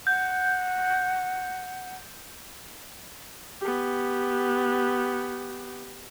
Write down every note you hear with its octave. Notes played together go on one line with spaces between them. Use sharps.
F#5 G6
B3 G4